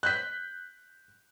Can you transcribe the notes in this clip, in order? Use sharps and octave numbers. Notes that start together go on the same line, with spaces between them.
F#6 G6 B6